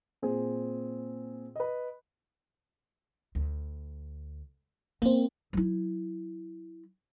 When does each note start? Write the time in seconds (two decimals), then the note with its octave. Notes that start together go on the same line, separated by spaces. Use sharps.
0.22 A#2 C4 G#4
1.56 B4 D#5
3.35 D2
5.02 A#3 C4 C#4
5.53 F#3 E4